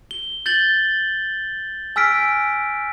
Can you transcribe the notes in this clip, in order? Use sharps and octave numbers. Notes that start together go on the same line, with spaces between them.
G7
G6 A6 F#7 G7
G#5 E6 F6 B6 D7